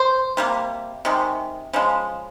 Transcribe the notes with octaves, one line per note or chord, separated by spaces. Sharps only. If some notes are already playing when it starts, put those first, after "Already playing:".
Already playing: C5
C3 G3 A#3
C3 D#3 G#3
C#3 F3 G#3